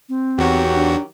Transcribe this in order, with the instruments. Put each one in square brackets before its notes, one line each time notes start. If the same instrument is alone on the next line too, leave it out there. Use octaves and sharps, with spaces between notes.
[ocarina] C4
[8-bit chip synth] E2 F#4 [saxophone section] D#3 F#3 G4
[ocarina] D4